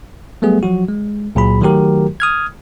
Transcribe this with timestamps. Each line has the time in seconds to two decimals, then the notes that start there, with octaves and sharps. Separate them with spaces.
0.42 F#3 G3 A3 B3 G#4
0.63 F3 F#3 F#4
0.89 G#3
1.35 C#2 A#2 F#3 G#4 B5
1.61 D#3 F#3 A3 F#4 G4 A#4
2.20 D#6 F6 G#6